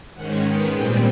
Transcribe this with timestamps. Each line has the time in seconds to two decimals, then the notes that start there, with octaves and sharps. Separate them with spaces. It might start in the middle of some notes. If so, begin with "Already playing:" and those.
0.14 G#2 D#3 G#3 C#4 F#5
0.43 D#3 G#3 B3 G5
0.73 A#2 G3 C4 G5